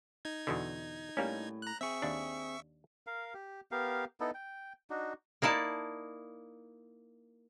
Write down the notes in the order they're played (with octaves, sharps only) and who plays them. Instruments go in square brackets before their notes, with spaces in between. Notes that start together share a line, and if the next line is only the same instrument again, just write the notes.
[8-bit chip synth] D#4 G#6
[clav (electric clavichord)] E2 B2 D3
[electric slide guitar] A2 [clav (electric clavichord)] G3 A#3 C#4
[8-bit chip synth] A#5 F#6
[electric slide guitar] C4 G#4 [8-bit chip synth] E5 C#6
[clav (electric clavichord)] D#2 D4
[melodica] A#4 F5
G4
B3 G4 A#4 F5
B3 D#4 E4 A4
G5
D4 D#4 F#4
[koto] A#3 D#4 E4 D5 A5